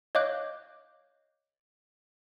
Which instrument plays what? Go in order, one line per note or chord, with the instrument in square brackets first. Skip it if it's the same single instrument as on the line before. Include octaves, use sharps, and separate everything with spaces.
[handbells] C#5 D#5 F5 D6 F#6 G6